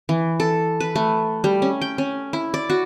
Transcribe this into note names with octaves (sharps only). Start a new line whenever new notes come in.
E3
A4
B4
A3
G3
C#4
G5
C#4
E4
D5
F#4